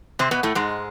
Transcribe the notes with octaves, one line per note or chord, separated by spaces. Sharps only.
C3 C4
B2 B3
A2 A3
G#2 G#3